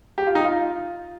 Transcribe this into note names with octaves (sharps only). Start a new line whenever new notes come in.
G4
F4
D#4
F4